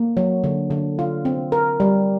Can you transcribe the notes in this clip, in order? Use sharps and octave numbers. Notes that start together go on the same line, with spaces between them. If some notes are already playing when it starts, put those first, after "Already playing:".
Already playing: A#3
F#3
D3
D3
F4
C4
A#4
G3